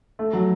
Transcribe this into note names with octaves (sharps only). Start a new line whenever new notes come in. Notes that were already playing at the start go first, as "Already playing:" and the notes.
A3
F#3